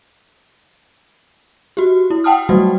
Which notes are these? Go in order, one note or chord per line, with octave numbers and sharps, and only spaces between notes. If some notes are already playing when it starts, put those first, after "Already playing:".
F#4 G4
E4
F#5 G5 A5 D#6 F6
F#3 G3 A3 F#4